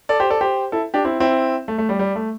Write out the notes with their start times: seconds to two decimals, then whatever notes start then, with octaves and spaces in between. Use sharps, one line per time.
0.09 A4 D5
0.20 G4 C5
0.30 A4 D5
0.41 G4 C5
0.72 E4 A4
0.94 D4 G4
1.05 C4 E4
1.20 C4 E4
1.68 A3
1.78 A3
1.89 G3
1.99 G3
2.16 A3